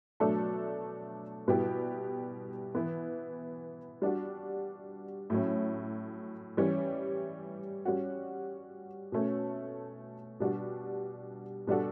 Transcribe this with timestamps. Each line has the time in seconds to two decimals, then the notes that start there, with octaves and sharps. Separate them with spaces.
0.20 B2 F#3 A3 D4 A4
1.48 B2 G3 B3 E4 G4
2.75 E3 B3 E4
4.02 G3 D4 F#4
5.30 A2 F#3 C#4
6.57 E3 G3 C#4
7.85 G3 C#4 F#4
9.12 B2 A3 C#4
10.40 B2 G3 D4 F#4
11.67 B2 G3 D4 F#4 A4